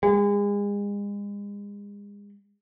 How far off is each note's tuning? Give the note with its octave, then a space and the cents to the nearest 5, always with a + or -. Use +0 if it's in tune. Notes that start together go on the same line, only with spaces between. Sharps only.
G#3 -35